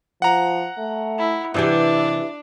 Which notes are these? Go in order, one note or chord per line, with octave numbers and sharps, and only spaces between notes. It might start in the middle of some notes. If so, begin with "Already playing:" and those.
F3 F#5 A#5
A3
E4
C3 E3 D4 E4 G4